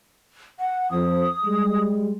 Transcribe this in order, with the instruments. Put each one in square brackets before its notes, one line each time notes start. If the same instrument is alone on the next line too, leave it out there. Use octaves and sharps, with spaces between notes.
[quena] F#5
[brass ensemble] F2 F3 [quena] D#6
[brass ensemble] G3 G#3